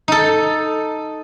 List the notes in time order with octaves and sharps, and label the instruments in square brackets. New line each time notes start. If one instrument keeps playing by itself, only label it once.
[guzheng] D#4 A4